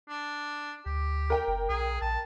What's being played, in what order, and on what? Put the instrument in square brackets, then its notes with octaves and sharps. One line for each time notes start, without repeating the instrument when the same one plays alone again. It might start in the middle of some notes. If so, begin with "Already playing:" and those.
[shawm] D4
[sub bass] D2 [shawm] G4
[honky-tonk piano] A#4 G5
[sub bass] F#1
[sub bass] B1 [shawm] G#4
[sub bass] A#1 [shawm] A5